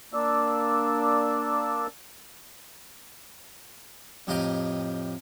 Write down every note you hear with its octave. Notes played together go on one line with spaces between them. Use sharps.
A#3 D4 D5 E6
F2 A2 G4 D#5 G5 A#5